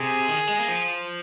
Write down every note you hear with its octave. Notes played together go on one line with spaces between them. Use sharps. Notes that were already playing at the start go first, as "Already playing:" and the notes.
Already playing: C3 G#4
D#3
G#3
A#3
F3